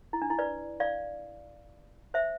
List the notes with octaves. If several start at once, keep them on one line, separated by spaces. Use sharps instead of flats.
E4
D4
E4
B4 D5
D5 F5
C5 E5